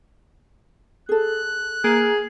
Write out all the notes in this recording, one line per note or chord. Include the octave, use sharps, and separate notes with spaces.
G#4 A4 F#6
A#3 G#4